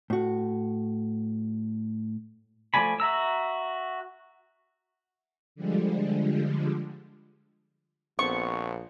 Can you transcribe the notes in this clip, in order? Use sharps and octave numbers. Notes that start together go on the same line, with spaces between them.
A2 F#4
F3 A3 D5 G#5 B5
F#4 E5 A#5 E6
D3 F3 G3 G#3
A#1 B3 C4 A4 C#6